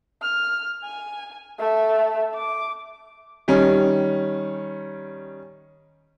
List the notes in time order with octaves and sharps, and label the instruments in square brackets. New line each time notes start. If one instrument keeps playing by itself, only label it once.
[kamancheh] F6
G#5
A3 E5
D6
[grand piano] D#3 G3 C#4